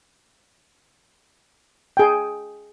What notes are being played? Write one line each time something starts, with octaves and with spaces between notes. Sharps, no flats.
G#4 G5